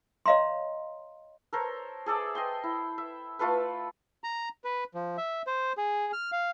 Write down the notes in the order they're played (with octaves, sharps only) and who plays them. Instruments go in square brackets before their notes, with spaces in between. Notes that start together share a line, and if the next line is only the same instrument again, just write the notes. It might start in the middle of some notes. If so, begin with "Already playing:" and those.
[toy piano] C#5 D#5 F5 A#5 C6
[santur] A4 A#4 C5 C#5
G#4 A4 D5 E5
D#5 G5 C6
E4
E5
A3 F4 A4 B4
[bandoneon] A#5
B4
F3
E5
C5
G#4
F6
F5